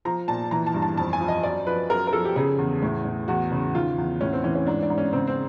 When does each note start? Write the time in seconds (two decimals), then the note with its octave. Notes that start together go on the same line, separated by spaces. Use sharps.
0.05 F3 A#5
0.28 A#2 A5
0.51 E3 A#5
0.67 A5
0.74 G2
0.82 A5
0.97 F2 A5
1.13 G#5
1.21 F3
1.28 D#5
1.43 F#2 D5
1.67 F3 B4
1.90 F#2 A#4
2.07 A#4
2.13 F3 A4
2.25 G4
2.36 C#3 G#4
2.58 E2
2.82 A2
3.05 A2
3.28 E2 F#4
3.52 C#3
3.75 D#3 F4
3.98 E2
4.21 A2 C#4
4.33 C4
4.44 E3 C#4
4.55 C#4
4.67 G#2 D4
4.83 D4
4.90 G#2
4.98 C#4
5.13 C#3 C4
5.27 C4